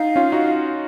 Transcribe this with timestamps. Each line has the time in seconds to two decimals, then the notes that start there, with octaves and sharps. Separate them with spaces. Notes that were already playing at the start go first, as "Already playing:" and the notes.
Already playing: D#4 F5
0.16 C#4 F4
0.32 D#4 F#4